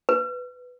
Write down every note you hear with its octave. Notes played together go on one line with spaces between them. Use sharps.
B4